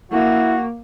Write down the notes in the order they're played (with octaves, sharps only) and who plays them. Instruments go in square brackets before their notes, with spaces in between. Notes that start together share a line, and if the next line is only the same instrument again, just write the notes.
[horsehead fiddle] A#3 [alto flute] E4 [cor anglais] F#4